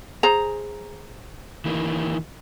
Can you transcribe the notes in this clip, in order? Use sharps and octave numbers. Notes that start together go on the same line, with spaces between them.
G#4 C5 A#5
D#3 E3 A#3